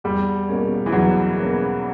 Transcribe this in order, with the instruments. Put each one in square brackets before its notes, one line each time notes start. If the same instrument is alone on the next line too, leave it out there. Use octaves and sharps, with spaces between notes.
[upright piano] E2 [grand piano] G3
[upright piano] B2 A#3 C#4
[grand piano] E3
[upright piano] E2 [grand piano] F#3
[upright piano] B2 A#3 C#4